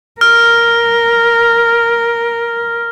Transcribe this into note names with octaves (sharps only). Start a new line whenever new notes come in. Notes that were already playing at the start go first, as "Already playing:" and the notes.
A#4 F6